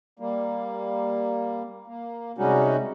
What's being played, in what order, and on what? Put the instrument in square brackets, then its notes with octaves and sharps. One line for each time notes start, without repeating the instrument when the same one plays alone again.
[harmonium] G3 A#3
A#3
C3 G3 G#3 C#4 D#4 F#4